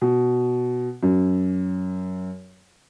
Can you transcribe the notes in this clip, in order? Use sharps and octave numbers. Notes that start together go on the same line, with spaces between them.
B2
F#2